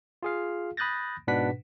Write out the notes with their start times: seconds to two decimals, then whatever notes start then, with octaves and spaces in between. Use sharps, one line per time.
0.23 F4 G#4 F5
0.77 B5 D#6 F#6 G6 A6 A#6
1.27 G#2 B2 D4 B4 F#5 B6